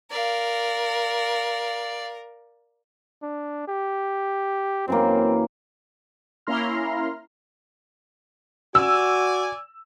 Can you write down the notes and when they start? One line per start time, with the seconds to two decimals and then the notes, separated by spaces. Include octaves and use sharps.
0.11 A#4 D5 F5
3.23 D4
3.68 G4
4.88 F#2 E3 A#3 C4
6.47 A#3 C#4 E4 A#5 C6 F6
8.75 F#4 D5 G#5 E6